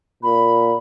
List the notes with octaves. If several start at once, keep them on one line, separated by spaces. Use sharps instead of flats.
A#2 B5